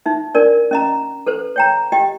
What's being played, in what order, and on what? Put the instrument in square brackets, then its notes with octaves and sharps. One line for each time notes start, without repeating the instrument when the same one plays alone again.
[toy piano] D#4 E5
D4 A#4 D5
C#4 D#5 A#5
A4 B4 C5
C#5 G5 A#5
G4 D#5 G5